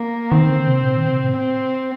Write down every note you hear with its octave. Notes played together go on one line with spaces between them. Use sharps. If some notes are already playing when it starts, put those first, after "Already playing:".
Already playing: A#3
D#3 C4
D3
C3
A#2
D#3
C3
A2
C4